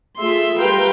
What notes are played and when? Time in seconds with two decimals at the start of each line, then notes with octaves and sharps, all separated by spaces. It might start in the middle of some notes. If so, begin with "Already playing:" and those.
0.19 A3 F4 G#4 E5 C6
0.58 G3 A#4 B4 F5 G5 C6